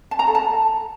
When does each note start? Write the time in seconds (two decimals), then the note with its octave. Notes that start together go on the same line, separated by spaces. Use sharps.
0.11 A5
0.19 A#5
0.27 A4
0.35 A5